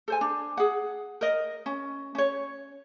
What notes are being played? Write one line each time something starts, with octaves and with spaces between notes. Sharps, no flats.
A4 C5 G#5
D4
G#4 F#5
A#4 D#5
C#4
C#4 C#5